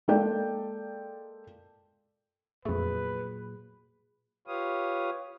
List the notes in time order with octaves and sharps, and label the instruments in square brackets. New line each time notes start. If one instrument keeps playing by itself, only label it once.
[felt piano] G#3 A#3 A4 D5 G5
[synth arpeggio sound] F2 A3 [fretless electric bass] A#2 F#3 [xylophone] G#4 [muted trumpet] B4
[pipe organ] F4 G4 B4 C#5 F5 D#6